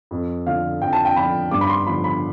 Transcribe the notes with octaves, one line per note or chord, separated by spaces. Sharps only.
F2
D3 F3 F5
F2 G5
A5
G5
D3 F3 B5
G2 D6
B5
C6
D3 F3 B5
B5